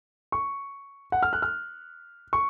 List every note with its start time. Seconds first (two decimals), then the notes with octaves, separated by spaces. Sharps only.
0.32 C#6
1.12 F#5
1.23 F6
1.33 F#6
1.42 F6
2.33 C#6